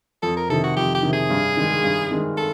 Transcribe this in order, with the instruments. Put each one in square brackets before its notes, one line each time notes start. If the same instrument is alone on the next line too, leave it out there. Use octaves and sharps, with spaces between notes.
[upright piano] F2 [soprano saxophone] A4
[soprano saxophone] A#4
[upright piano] C3 D#3 [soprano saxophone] A4
[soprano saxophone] F#4
[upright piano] F2 [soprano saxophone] G4
[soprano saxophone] G4
[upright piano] C3 D#3
[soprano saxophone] G#4
[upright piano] G2
D#3 G#3
G2
D#3 G#3
[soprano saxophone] A4